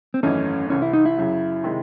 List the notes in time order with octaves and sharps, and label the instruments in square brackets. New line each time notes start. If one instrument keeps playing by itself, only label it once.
[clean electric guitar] C4
[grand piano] G#1 F#2 E3 A3 D#4 [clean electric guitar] C#4
[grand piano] C2 C3 E3 [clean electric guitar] C#4
[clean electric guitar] E4
D#4
E4
[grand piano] F#2 C#3 F#3
C3 D#3 G#3